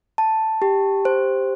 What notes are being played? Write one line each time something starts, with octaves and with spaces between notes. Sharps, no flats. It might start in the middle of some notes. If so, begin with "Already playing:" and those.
A5
G4
C5